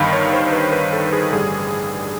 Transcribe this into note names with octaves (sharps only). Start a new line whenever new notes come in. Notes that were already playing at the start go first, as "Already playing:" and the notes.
Already playing: G1 G2 D#3 F5 B5
C#5
C5
C5
B4
B4
A4
G#4
A1 G2 D3 G3 G#4